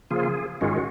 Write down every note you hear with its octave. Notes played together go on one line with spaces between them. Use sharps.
C#3 F3 A#3 F4 G#4
G#2 D#3 G#3 C#4 F4 F#4